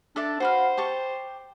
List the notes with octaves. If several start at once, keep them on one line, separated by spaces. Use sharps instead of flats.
D4 A4 D5 E5
F#4 B4 C5 F5
G4 A5 C#6